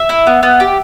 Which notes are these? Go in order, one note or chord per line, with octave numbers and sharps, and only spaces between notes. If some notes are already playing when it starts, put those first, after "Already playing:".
Already playing: E5
E4
B3
B3
G4